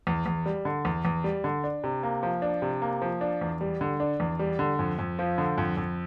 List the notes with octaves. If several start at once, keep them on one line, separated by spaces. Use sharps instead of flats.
E2
E2
G3
D3
E2
E2
G3
D3
D4
C3
A#3
F3
D4
C3
A#3
F3
D4
E2
G3
D3
D4
E2
G3
D3
F2
F2
F3
D3
F2
F2